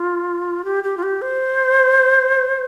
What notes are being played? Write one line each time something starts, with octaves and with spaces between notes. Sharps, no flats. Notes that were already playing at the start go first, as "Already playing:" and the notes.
Already playing: F4
G4
G4
F4
G4
C5